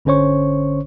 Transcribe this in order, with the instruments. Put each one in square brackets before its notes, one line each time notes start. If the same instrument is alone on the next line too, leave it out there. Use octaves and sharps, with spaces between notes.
[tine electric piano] G1 D3 C#4 C5 C#5 C#6